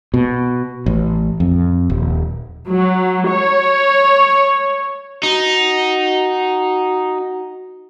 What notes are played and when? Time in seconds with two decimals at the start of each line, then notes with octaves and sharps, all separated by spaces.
0.14 B2
0.86 A1
1.40 F2
1.90 D#1
2.69 F#3
3.29 C#5
5.23 D#4 F#4